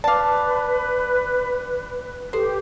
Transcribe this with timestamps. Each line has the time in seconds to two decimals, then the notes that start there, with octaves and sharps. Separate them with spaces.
0.04 B4 D5 F5 A5 D6
2.33 G4 A4 B4 C5